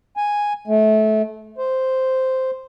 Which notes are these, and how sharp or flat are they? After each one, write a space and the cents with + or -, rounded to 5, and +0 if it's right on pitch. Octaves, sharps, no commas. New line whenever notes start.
G#5 -5
A3 -25
C5 -5